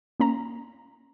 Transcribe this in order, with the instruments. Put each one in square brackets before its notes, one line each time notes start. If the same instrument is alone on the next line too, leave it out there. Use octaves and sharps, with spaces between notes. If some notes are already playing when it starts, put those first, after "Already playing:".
[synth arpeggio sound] A#3 C#4 A#5